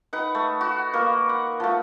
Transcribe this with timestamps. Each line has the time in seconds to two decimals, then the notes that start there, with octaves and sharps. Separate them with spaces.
0.13 D#4 B4 F#5
0.35 A3
0.61 F#4
0.93 A#3 A#4 B4
1.29 F#5
1.60 F3 A3